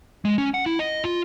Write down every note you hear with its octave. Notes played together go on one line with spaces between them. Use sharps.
G#3
C#4
F#5
E4
D#5
F4